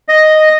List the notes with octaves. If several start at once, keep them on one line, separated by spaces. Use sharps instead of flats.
D#5